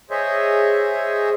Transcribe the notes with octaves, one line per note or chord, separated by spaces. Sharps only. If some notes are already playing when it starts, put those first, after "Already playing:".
G#4 C5 C#5 D#5 E5